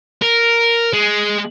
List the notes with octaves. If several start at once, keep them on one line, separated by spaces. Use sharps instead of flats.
A#4
G#3